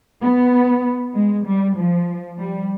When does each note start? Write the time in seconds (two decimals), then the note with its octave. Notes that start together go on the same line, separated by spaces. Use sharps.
0.22 B3
1.15 G#3
1.46 G3
1.77 F3
2.39 G3